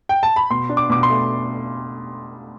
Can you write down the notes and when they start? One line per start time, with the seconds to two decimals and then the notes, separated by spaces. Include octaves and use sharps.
0.09 G5
0.23 A5
0.36 B5
0.51 B2 C6
0.69 D4
0.77 D6
0.90 B2 D6
1.03 C6
1.10 A3